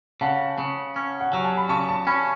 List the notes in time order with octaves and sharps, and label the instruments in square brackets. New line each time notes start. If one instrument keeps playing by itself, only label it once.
[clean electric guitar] C#3 [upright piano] F#5 A5
[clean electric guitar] C#3
C#4
[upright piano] F#5
[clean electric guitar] F#3 [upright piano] G#5
[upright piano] A5
B5
[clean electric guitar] C#3 [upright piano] A5 C#6
[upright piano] A5 C#6
[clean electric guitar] C#4 [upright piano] G#5 B5